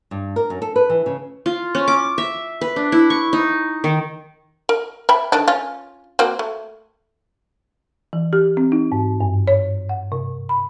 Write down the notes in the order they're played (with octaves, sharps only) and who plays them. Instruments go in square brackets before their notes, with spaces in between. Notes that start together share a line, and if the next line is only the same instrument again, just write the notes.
[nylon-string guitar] G2
A#4
F#2
A4
B4
E3
C#3
[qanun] F4
C#4
D6
E5
B4
D4
E4
C#6
D#4
D#3
[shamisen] A#4
E5 G5 B5
D3 D#3 D4
C#4 F4
A#3 C4 F#4
A3
[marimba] E3
G4
C4
D#4
G#2
G2
C#5
F#5
C3
B5